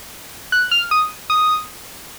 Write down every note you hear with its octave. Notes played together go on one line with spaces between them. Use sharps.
F#6
F6
D#6
D#6